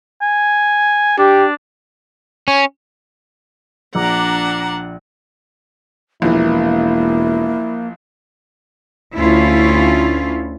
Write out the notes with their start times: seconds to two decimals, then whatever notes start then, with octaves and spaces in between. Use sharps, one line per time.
0.21 G#5
1.18 D4 G4
2.48 C#4
3.95 A#1 D4 F#5 A#5 D6
6.22 E1 A#1 E3 A#3 E4
9.16 D2 C#4 E4 F4